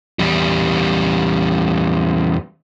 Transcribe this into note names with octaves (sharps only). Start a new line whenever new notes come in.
E2 G3